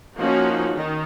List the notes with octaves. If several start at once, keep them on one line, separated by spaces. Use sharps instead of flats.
F3 A#3 C#4 D#4 F#4
D#3 D#4